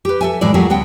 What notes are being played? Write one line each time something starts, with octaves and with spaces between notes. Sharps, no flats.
G4 B4
A4 E5 G#5
A2 E3 G#3 E4 D5
F#3 A3 F4 G4 G#4 A#4
D2 B3 F#5 G5